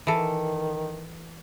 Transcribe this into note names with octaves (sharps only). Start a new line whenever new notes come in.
D#3 E3 A4